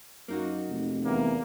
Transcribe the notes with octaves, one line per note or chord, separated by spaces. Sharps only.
F#2 A#3 D#4 F#4
F1
E2 A#3